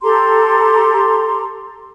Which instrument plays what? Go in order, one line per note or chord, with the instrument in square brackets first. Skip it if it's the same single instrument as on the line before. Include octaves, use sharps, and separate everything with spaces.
[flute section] G4 A4 A#5 C6